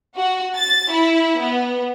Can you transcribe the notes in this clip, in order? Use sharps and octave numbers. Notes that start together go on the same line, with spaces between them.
F#4
A6
E4
B3